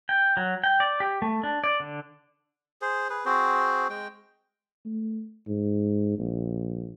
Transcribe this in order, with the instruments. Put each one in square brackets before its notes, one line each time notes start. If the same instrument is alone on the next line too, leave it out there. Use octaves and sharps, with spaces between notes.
[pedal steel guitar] G5
F#3
G5
D5
G4
A3
D4
D5
D3
[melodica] G#4 C5
G#4 B4
C4 F#4 G#4 C5
G#3 G5
[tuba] A3
G#2
A#1